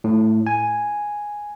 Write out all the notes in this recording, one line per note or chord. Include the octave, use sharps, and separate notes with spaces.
A2
G#5